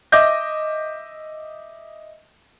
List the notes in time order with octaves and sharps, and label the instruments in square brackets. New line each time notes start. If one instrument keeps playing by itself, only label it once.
[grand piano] D#5 E5 D6 G6 A#6